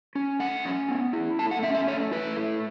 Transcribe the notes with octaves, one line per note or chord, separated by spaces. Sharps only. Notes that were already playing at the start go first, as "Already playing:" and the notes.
C#4
A3 F#5
C#4
B3
E4
A3 A5
F#5
C#4 E5
E5
A3 C#5
E4 B4
A3